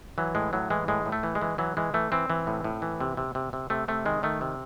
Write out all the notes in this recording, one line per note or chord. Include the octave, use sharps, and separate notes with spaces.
E3 F#3
A2 G#3
A2 F#3
E3 G#3
A2 G#3
A2
A3
E3
G#3
E3
E3 F#3
E3 G#3
E3 A3
E3 C4
E3
A2
A2
E3
C3
C3
C3
C3
C3 A3
C3 A3
D#3 G#3
D#3 A3
C3